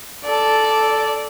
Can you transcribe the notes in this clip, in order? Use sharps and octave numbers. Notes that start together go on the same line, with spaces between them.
A4 D5